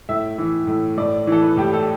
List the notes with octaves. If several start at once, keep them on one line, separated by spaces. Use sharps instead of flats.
A2 E5
E3
A2
A2 D5
E3 A4
B4
A2 G4
A4